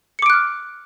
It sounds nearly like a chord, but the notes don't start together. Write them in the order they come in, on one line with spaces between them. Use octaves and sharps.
C#7 D6 D7 F#6 F6